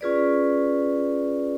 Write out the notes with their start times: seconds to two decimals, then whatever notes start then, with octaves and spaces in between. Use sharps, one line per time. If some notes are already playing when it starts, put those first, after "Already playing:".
0.01 C#4 F4 G#4 B4 D5